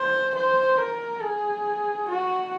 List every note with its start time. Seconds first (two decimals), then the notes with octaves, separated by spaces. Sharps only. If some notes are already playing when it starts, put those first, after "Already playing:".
Already playing: C5
0.35 C5
0.78 A#4
1.22 G#4
2.09 F#4